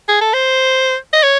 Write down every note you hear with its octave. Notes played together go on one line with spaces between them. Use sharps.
G#4
A4
C5
D#5
C#5